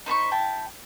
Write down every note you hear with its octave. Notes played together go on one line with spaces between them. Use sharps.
D#4 C5 B5 C#6
E4 G5 A5